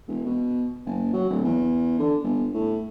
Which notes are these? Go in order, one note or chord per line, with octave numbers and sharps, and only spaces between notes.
E1
B2
F#1
F#3
D1
E2
D3
G1
A2